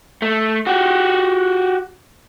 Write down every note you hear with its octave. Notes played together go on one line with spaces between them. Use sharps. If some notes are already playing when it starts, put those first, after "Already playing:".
A3
F#4 G4